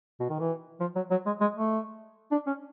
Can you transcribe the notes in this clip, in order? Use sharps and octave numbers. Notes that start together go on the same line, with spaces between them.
B2
D#3
E3
F3
F#3
F#3
G#3
G#3
A3
D4
C#4